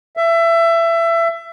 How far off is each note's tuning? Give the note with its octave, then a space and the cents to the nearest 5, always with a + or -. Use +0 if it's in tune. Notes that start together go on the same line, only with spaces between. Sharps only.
E5 +25